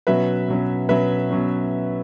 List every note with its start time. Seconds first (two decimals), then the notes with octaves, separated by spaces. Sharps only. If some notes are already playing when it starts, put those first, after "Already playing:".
0.07 B2 F#3 C#4 B4 E5
0.48 B2 F#3 C#4
0.89 B2 F#3 C#4 B4 E5
1.31 B2 F#3 C#4